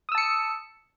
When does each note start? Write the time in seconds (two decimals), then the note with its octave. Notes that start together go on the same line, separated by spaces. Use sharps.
0.09 D#6
0.12 E6
0.15 A5
0.18 C#7